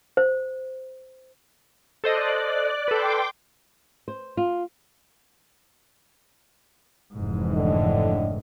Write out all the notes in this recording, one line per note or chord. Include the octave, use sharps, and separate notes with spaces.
C5
A4 C5 D5 D#5 F#6
A4 B4 G5 C6 D6
C5
F4
F1 G#2 E3
A2 D3 D#5